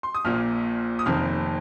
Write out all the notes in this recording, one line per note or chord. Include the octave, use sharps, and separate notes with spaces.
C6
D#6
A#1 A#2 A#3 F6
D#6
F1 F2 D#3 A#3 F6